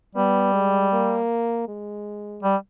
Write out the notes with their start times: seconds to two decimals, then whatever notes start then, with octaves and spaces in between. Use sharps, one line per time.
0.15 G3 B3
0.54 G#3
0.92 A#3
1.68 G#3
2.43 G3